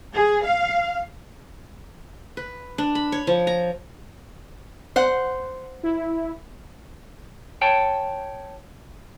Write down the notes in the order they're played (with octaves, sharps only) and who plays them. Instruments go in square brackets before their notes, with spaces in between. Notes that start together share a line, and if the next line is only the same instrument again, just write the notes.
[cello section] G#4
F5
[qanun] B4
D4
B5
C#5
F3
A#5
[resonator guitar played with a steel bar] C5 F#5
[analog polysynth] E4
[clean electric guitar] C#5 G5 A5